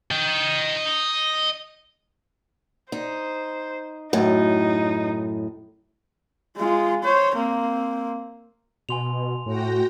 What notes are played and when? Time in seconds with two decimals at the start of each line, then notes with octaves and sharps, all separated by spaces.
0.11 D#5 G5
2.92 D#4 C5
4.13 F#2 A2 D#4
6.57 G#3 F4
7.03 C5 C#5
7.35 A#3 C4
8.89 B2 G#5 C6 F7
9.46 A2 F#4 G5 A#6